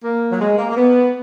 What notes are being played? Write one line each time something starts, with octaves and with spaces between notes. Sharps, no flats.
A#3
F#3
G#3
A#3
A#3
B3